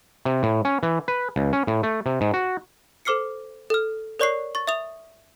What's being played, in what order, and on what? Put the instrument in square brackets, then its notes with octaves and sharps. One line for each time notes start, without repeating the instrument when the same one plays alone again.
[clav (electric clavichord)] C3
A2
C#4
E3
B4
C#2
C#4
A2
A3
C3
G#2
F#4
[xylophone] A4 C5 D6 F6 C7 C#7
A4 F6
A#4 C#5 D5 C#6 F#6 C7
C#6 A6
E5 D#6 F7 G7